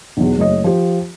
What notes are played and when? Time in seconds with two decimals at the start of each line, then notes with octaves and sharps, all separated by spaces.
0.17 B1 E2
0.37 F#1 A3 C#5 D#5
0.64 F3 G4